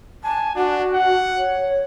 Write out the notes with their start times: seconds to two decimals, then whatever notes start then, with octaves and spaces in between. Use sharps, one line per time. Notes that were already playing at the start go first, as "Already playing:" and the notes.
0.24 G#5 A5
0.56 D4 F#4
0.94 F#5
1.37 C#5